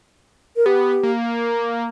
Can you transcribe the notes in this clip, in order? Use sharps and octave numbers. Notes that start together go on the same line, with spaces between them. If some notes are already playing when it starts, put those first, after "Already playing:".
A#4
B3 G4
A#3